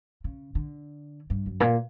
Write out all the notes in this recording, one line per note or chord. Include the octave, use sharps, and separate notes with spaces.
C#3
D3
G2
F#2
A#2